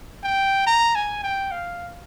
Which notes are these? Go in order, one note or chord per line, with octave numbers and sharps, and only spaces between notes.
G5
A#5
G#5
G5
F5